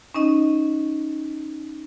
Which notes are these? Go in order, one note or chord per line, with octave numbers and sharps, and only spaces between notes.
C#4 D#4 D#5